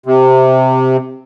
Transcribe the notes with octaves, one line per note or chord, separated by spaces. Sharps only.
C3